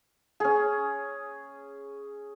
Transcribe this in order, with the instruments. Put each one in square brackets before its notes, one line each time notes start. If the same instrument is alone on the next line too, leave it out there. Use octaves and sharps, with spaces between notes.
[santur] C#4 G#4